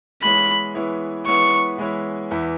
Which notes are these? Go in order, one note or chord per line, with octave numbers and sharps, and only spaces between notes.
E3 G#3 B3 E4 C#5 B5
E3 G#3 B3 E4 C#5
E3 G#3 B3 E4 C#5 C#6
E3 G#3 B3 E4 C#5
E2 E3 B3 E4